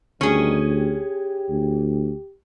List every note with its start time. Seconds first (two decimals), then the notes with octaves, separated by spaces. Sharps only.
0.21 D2 G2 D#3 G3 C#4 G#4
0.66 G4
1.50 D2